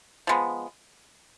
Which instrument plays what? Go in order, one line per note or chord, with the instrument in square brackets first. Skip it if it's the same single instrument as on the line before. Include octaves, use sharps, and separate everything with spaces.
[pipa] F3 G#3 B3